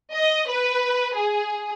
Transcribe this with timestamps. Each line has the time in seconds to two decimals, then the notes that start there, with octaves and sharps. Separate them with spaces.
0.13 D#5
0.49 B4
1.15 G#4